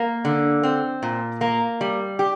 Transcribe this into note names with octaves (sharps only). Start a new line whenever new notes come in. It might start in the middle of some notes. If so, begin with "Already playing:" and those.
Already playing: A#3
D3
C4
A#2
A#3
G3
G4